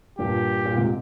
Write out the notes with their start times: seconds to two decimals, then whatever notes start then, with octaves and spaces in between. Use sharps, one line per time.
0.19 G2 A#2 G4
0.65 A#2
0.76 G#2 C3